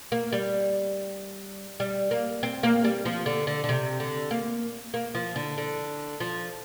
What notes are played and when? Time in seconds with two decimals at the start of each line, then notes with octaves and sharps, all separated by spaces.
0.12 A#3
0.32 G3
1.80 G3
2.11 A#3
2.43 C4
2.63 A#3
2.84 G3
3.05 F3
3.26 D3
3.47 D3
3.64 D3
3.69 C3
4.00 D3
4.31 A#3
4.94 A#3
5.15 F3
5.36 D3
5.58 D3
6.20 F3